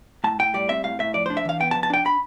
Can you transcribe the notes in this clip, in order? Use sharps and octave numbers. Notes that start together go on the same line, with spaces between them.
A2 A5
A2 G5
G3 D5
C4 E5
A2 F5
A2 E5
F2 D5
D4 C5
E5
E3 F5
B3 G5
A5
F2
A5
D4 G5
B5